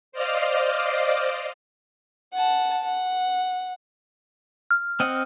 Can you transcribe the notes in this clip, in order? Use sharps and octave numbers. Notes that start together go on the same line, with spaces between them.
C5 D5 D#5 F5 D6 F6
F#5 A5
F#5
F6
C4 D#5 F#5